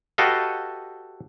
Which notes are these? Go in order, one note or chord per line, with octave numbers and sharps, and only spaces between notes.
F#4 G4 A4 B4 D#5 F5